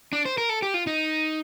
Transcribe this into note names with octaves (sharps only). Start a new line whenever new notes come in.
D4
C5
A#4
A4
G4
F4
D#4